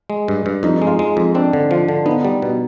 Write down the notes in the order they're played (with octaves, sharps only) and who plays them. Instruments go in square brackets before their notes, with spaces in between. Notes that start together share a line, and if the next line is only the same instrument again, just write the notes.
[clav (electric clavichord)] G#3
G2
G2
[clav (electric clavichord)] F2 [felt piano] D#4
[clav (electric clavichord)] G#3
[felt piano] F4
[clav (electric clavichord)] G#3
F2
[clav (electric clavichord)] C4 [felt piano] D4
[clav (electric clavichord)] D3
[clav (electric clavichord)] F3 [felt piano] F4
[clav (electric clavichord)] D3
[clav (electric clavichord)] B3 [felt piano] D#4
[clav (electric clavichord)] G3
B2